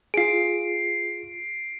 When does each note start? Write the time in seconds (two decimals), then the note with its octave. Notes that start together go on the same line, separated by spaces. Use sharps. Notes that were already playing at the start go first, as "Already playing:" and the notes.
0.14 F4 G#4 C7 D7